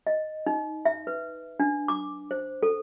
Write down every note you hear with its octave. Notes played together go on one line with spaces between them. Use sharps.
D#5
D#4
E5
B4
D4
D6
C5
A4